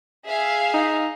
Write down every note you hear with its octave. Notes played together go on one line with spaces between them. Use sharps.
G#4 E5 F5
D#4